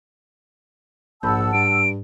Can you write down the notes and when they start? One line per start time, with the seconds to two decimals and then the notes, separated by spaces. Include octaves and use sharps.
1.23 A#1 G#2 F#5 A5 B5 E6 G6
1.53 G2 D7